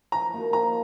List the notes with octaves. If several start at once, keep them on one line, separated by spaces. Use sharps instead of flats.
F3 A#5
A#3 D#4 F#4
F3 A#5